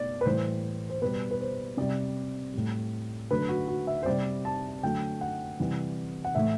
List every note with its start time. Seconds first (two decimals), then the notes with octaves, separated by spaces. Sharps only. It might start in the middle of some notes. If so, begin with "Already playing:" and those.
Already playing: B2 A3 D5
0.21 B4
0.25 A2 E3 G3 C5
0.90 C5
1.02 B2 G3 B4
1.31 B4
1.40 C5
1.77 C3 G3 D5
2.54 A2 G3
3.30 D3 F#3 A3 B4
3.49 F#4
3.68 F#4
3.87 E5
4.03 C5
4.06 C3 G3 D5
4.45 A5
4.83 D3 F#3 A3 G5
5.21 F#5
5.60 C3 E3 G3
6.25 F#5
6.35 A2 E3 A3 E5